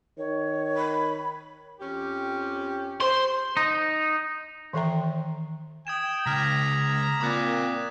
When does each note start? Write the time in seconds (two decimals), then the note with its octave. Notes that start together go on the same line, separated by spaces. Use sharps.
0.18 D#3 C#5
0.76 B5
1.80 F2 C#4 G4
3.01 C5 C6
3.57 D#4
4.73 D#3 E3 A4 E5 G5 A#5
5.87 G5 D#6 G#6 E7
6.26 C#2 A#5 D6 F6 B6
7.21 A#2 A#3 C4 B5 D6 F#6 A6